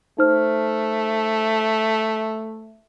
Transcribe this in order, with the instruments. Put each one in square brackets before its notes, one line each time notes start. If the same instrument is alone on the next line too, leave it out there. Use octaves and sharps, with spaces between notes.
[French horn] A3 [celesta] D#4 C5 F6